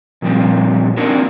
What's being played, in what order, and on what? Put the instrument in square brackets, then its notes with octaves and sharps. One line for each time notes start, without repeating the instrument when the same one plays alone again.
[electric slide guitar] A#2 F3 G3 C4
A#3 C4 D4 D#4 F#4 A#4